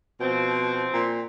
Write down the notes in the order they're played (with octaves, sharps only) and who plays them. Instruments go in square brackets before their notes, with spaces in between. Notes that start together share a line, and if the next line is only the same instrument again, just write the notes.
[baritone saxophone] B2 [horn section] F3 C4
[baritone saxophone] A#2